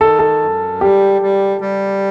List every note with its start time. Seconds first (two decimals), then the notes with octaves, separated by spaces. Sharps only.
0.01 D#3 A4
0.19 A4
0.42 F#2
0.81 G3 G4
1.22 G3
1.61 G3